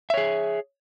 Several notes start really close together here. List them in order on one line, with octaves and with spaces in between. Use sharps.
E5 C#5 G#4